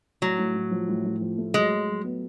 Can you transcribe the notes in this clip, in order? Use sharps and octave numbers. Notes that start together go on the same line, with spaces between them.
A2 F#3
A2
A2
F3
A2
A2
F3
A3
F#3 G#3
F#3
F#3
B3